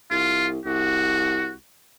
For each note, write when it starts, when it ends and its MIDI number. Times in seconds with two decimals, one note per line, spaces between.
0.11 0.59 36
0.11 0.47 65
0.66 1.53 36
0.66 1.53 66